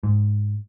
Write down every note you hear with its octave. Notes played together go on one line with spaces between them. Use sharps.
G#2